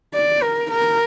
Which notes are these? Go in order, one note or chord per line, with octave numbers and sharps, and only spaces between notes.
D5
A#4
A#4